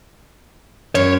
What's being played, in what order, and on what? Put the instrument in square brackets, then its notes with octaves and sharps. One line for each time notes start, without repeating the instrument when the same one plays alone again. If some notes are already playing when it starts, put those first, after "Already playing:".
[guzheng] F#2 [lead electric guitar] C#5